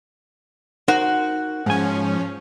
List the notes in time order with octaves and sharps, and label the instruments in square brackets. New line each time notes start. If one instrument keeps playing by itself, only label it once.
[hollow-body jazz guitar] D#4 A#4 C5 [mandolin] F#4
[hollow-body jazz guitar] G#2 G#5 [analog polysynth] F3 C#4